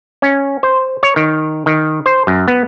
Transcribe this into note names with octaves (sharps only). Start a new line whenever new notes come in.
C#4
C5
C#5
D#3
D#3
C5
F#2
B3